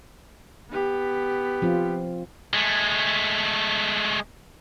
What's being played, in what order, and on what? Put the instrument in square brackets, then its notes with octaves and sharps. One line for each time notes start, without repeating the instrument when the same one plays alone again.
[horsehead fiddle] B3 G4
[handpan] F3 C4 F4
[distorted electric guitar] G#3 A3